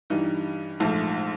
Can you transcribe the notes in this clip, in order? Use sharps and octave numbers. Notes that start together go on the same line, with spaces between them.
G2 E3 G3 D#4
A#1 G#2 F3 A3 A4